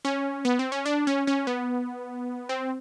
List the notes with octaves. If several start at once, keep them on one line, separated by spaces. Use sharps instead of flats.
C#4
B3
C4
C#4
D4
C#4
C#4
B3
C4